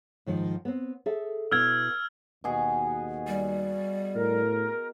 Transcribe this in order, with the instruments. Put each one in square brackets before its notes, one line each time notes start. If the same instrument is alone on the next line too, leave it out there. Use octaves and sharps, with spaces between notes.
[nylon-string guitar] G#2 D#3 F3
B3 C4
G#4 A4 E5
[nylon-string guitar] B2 B3 E4 [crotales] E6 F6 G#6
[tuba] D#2 [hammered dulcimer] B2 F#4 G#4
[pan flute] G3
[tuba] A2 [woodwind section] A#4